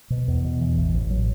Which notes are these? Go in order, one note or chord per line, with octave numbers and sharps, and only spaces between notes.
B2
E2
B2
E3
A1
A1
F#3